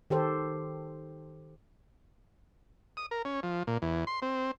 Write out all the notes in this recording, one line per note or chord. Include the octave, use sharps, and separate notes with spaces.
D#3 G4 A4 C5
D#6
A#4
C#4
F3
A#2
E2
C6
C4